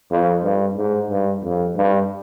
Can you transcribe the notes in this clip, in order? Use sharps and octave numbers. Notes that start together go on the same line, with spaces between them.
F2
G2
G#2
G2
F2
G2